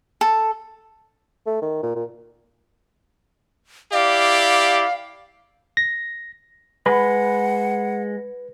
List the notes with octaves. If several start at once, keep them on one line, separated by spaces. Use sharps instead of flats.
A4
A3
D#3
A#2
A#2
E4 G4 D5 F5
A#6
G#3 B4 F#5 B5